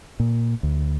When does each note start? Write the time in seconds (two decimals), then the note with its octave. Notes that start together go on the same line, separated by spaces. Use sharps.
0.20 A#2
0.63 D2